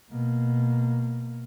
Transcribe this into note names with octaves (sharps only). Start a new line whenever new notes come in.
B2 A#3